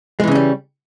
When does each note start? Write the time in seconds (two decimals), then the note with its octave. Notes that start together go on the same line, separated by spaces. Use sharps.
0.20 G#3
0.24 E3
0.27 C#3
0.31 C#4
0.35 G3